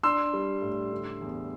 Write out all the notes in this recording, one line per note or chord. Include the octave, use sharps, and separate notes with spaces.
D4 C6 E6
G3
A2
D3
E2